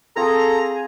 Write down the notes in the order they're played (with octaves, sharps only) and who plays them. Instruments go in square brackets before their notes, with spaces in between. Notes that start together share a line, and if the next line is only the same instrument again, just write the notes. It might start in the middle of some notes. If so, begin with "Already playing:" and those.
[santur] C4 F4 [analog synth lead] G#4 [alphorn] A4 [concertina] A#5